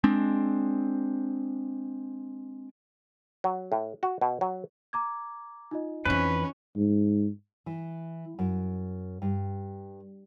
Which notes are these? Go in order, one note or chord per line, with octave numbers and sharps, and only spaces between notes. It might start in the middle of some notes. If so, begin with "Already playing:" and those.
G#3 C4 D4
F#3
A2
F#4
B2
F#3
A#5 D6 G#6
D#4 F4 D#5
F2 E3 C#4 B4
G#2
E3
F#2
G2